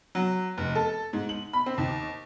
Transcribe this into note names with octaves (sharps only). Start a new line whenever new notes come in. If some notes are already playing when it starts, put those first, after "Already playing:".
F#3
F1
A4
G#2
F#7
B5
C4
D#2